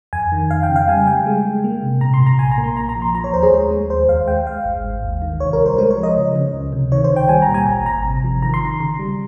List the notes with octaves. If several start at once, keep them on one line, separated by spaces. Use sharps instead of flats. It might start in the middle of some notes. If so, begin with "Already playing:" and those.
F2 G#5
D#3
F2 F5
G5
C#3
F5
G3 G#5
G3 G5
G#3
G#3
A#3
C3
A#2 A#5
C6
A#2
A#5
A#1 G#5
A#5
A#3
C6
A#1 A#5
A#5
F3
C6
F3 A#5
C#5
D#2 C5
G#4
G#3
G#3
D#2 C5
D#2 F5
G#3 G5
G#3 F5
G#1
G#2
D#2
D#3
C2 C#5
A#4
G3
C5
G#3 A#4
C#5
F3
D#5
C#3
C#3
C#2
C3
D#3 C#5
C5
C#2
G5
G3 G#5
A#5
A#2
G#5
G#1 A#5
G#1 A#5
C3
F3
D#3 A#5
C6
D#3 A#5
C#3
G3